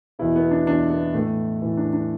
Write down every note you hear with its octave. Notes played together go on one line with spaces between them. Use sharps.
E2 B2 E4
B3
D4
E2 B2 D4
B3
A2 E3 A3
A2 E3
D4
D4